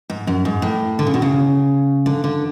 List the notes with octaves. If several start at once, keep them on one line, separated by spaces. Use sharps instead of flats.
G#2
F#2
G#2
A2
D3
C#3
B2
C#3
D3
D3